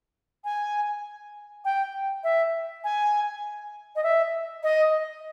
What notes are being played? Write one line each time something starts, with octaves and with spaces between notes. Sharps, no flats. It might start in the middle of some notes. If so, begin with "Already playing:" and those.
G#5
G5
E5
G#5
D#5
E5
D#5